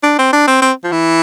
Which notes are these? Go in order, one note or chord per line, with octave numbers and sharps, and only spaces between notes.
D4
C4
D4
C4
C4
F3
E3